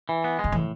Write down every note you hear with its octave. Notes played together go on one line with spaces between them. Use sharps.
E3
B3
G#3
D3
A2 E3